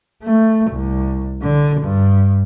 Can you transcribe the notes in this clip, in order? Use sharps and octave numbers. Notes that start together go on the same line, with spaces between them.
A3
C2
D3
G2